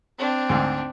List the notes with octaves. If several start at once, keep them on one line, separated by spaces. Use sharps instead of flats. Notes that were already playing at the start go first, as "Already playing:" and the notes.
C4 D4
D2 G#2